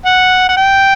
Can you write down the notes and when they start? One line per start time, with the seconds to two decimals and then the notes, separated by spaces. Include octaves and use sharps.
0.06 F#5
0.49 F#5
0.57 G5